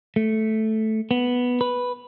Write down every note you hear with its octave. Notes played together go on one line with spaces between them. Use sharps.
A3
B3
B4